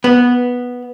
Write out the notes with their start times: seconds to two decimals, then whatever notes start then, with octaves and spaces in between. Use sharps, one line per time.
0.04 B3